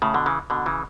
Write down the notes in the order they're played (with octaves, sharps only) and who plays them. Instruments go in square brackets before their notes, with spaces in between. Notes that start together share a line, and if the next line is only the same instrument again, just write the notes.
[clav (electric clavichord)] A2 C#3
B2 D3
C#3 E3
B2 D3
C#3 E3